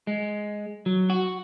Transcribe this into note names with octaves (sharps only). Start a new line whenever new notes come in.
G#3
F#3
F#4